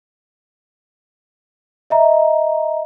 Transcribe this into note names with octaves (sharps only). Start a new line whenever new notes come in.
D#5 E5 A#5